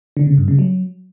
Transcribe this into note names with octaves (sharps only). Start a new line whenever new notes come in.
D3
C#3
G2
C#3
F#3